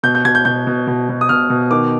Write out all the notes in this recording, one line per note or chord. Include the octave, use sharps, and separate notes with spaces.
B2 G6
G6
B2 G#6
G6
B2 G6
B2
B2
B2
D#6
B2 F6
B2
D#3 D6